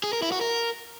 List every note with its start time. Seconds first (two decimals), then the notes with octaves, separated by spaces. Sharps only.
0.04 G#4
0.13 A#4
0.22 E4
0.32 F#4
0.41 A#4